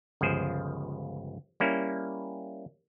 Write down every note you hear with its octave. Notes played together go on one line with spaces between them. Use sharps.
G1 C#2 F3 G#4 C5
G3 A#3 C#4 E4